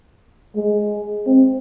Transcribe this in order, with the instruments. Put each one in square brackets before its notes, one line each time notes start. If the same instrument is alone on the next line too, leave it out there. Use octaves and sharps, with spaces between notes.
[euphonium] G#3
C4